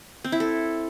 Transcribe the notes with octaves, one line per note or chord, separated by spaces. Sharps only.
C4
E4
A4